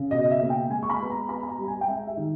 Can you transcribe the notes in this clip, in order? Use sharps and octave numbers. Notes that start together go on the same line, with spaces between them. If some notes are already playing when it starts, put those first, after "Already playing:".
Already playing: C#3
B2 D#5
E5
A#3
G5
G#3 G#5
C#6
B5
B3
A#5
B3 B5
B5
A#5
G3
A#5
G#5
G5
G#3 E5
E5
D#3